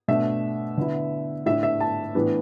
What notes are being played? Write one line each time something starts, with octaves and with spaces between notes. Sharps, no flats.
B2 A3 D4 E5
D3 B3 E4
A2 A3 D4 E5
E5
A5
A2 E3 B3 D4